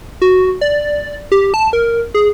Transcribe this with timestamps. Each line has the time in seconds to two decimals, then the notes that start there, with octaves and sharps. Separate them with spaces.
0.22 F#4
0.61 D5
1.32 G4
1.54 A5
1.73 A#4
2.14 G#4